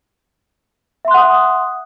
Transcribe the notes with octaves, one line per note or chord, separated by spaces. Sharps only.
E5 F#5 C6 D#6 F#6